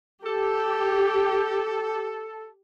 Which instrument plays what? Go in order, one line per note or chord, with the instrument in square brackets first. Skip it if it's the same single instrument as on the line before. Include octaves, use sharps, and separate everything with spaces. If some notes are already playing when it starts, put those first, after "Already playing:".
[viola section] G4 [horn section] A4